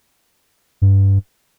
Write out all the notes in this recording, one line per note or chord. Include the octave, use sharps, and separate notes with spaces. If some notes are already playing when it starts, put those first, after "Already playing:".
G2